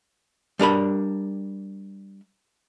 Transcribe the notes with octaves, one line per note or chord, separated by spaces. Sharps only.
G3 D4 A#4 B5